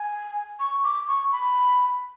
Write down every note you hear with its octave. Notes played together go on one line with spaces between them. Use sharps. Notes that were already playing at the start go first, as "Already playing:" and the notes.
Already playing: G#5
C#6
D6
C#6
B5